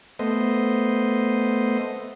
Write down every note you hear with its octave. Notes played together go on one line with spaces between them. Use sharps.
A3 B3 C5 D#5